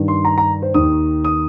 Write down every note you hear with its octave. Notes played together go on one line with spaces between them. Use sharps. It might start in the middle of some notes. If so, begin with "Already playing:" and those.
Already playing: G2 D#3
C6
A#5
A#5
C5
D#2 D#3 D#6
D#6